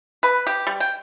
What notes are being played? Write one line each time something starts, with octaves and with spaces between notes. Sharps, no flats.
B4
G4
G3
G5